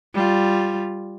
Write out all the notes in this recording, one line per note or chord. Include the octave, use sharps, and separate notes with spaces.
G3 F4